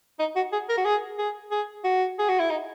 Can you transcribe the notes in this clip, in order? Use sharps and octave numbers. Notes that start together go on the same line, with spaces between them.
D#4
F#4
G#4
A#4
F#4
G#4
G#4
G#4
F#4
G#4
F#4
E4
D#4